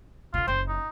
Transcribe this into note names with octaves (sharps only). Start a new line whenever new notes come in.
B2 D3 F4
F#1 C5
D#4